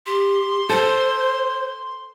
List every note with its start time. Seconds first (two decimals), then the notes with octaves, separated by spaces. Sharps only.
0.06 G4 C6
0.69 A4 C5